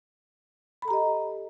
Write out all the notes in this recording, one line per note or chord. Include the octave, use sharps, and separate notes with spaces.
G4 A4 D#5 A#5 B5